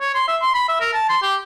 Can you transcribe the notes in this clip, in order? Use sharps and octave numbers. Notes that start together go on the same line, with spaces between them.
C#5
C6
E5
C6
B5
E5
A#4
A5
C6
G4